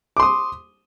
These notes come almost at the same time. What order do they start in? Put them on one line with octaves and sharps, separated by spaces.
D6 C6 D#6